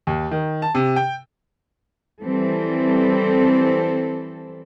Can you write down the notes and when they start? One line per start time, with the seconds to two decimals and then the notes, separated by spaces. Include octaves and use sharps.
0.07 D#2
0.31 D#3
0.62 A5
0.75 C3
0.96 G5
2.23 E3 G3 C4 A4